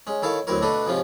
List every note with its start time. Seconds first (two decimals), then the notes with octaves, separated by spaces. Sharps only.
0.07 G#3 C#4
0.22 D#3 E4 A4 C#5 F5
0.47 D2 F#3 C4 E4 A#4 C#5
0.62 B2 A3 D4 F#4 A4 B4
0.87 G#2 C3 F3 C#4 F4